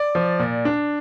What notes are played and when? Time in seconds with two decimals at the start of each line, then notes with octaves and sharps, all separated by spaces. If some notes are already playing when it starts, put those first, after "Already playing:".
Already playing: D5
0.15 F3
0.39 A#2
0.65 D4